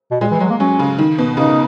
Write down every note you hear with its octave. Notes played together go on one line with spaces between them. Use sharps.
B2
A#2 G#3
E3
F#3 G#3
A#3
F#3 C#4
C#3
D#3
B2
C#3 D#4